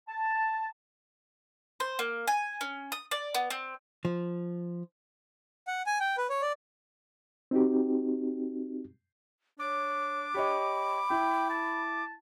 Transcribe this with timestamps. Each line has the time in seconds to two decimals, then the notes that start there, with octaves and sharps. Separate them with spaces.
0.08 A5
1.80 C5
1.99 A#3
2.28 G#5
2.61 C#4
2.92 D#6
3.11 D5
3.35 B3
3.50 C4
4.05 F3
5.67 F#5
5.86 G#5
6.00 G5
6.18 B4
6.30 C#5
6.42 D5
7.51 C4 D#4 F#4 G4
9.59 D4 C#5 D6
10.34 G4 C#5 D#5 B5
11.10 E4 G5
11.50 A5